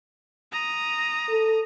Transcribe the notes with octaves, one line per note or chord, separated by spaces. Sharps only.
A#5 D#6
A4